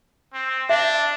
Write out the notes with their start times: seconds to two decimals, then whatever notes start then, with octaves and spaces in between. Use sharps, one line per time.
0.33 C4
0.69 D4 E5